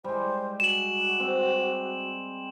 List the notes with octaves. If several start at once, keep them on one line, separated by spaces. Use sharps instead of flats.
G3 G#3 C5
F#4 E7 F#7
C4